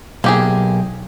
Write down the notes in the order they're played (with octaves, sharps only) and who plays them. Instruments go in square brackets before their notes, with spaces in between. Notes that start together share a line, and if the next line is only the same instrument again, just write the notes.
[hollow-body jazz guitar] B1 [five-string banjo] A#3 G4 G#4